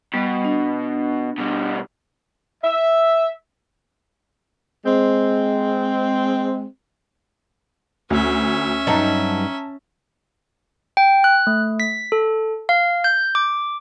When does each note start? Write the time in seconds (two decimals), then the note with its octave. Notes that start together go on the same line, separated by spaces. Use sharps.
0.14 B2 G3 B3
0.45 D4
1.38 B2 G3
2.64 E5
4.85 G#3 C4
8.10 D2 C#4 E5
8.87 G2 F#3 D#4 A5 A#5
10.97 G5
11.24 F#6
11.47 A3
11.80 B6
12.12 A4
12.69 F5
13.04 G6
13.35 D6